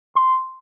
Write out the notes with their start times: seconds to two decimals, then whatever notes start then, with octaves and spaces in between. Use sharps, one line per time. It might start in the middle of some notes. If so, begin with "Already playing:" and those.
0.15 C6